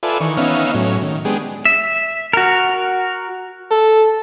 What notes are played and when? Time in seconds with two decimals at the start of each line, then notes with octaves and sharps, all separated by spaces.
0.03 F4 A4 B4 D5 E5 G#5
0.20 D#3 E3 C#6
0.37 B3 C#4 D#4 E5 F5
0.75 A2 F#3 C#4
1.02 D#3
1.25 G#3 B3 D4 G4 G#4
1.65 E5
2.33 F#4 A#4
3.71 A4